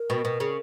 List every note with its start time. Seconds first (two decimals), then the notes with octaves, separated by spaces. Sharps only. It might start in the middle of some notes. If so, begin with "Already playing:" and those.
Already playing: A#4
0.10 B2
0.25 B2
0.40 C#3